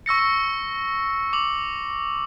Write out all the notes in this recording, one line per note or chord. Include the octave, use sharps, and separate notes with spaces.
C#6 E6 A#6 C#7
C#6
D6 F#7